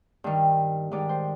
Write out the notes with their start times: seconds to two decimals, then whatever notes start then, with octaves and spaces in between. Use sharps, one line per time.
0.24 G2 D#3 G3
0.91 G#2 D#3 G3 D5
1.09 C5